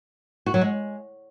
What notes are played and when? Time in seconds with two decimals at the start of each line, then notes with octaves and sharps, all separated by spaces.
0.46 F#4
0.54 F#3
0.61 G#3